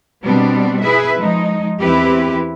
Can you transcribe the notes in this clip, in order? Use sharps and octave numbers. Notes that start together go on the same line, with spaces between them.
B2 G3 B3 C4 D4
E4 G#4 B4 E5
F3 G#3 D#4
E2 E3 C4 E4 G4 B4